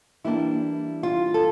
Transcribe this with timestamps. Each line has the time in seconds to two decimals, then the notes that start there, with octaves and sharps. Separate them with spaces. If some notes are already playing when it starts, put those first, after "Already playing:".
0.24 E3 G3 A#3 D4 E4
1.03 F4
1.34 A4